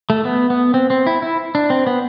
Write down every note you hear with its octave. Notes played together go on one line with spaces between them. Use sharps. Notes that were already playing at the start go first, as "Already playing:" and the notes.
A3
B3
B3
C4
C4
E4
E4
D4
C4
B3